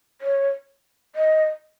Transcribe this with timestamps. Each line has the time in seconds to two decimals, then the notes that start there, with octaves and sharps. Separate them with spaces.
0.21 C#5
1.15 D#5